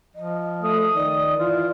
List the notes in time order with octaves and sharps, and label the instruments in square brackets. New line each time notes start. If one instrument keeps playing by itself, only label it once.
[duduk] F3 [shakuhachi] D#5
[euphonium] A3 [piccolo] D#6
[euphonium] D#3 [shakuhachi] D5
[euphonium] E3 [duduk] F4